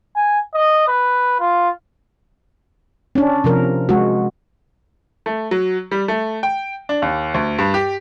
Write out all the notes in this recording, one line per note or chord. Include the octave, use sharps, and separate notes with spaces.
G#5
D#5
B4
F4
C#4 D4
C3 F3 A#4
G#3 F#4
A3
F#3
G3
A3
G5
D4
D#2
D2
G2
G4